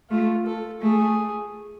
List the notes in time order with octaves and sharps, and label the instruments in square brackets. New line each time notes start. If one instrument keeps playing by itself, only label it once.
[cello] A3 [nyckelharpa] F4
[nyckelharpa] A4
[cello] A3 [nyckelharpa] G#4